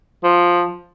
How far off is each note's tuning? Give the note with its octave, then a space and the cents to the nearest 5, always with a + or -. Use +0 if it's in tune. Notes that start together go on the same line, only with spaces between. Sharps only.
F3 +5